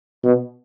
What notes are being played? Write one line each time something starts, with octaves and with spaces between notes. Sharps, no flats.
B2